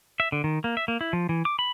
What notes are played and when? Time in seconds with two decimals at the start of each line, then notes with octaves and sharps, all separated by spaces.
0.20 E5
0.32 D3
0.44 D#3
0.64 A#3
0.77 E5
0.88 A#3
1.01 E4
1.13 F3
1.29 E3
1.45 D6
1.59 B5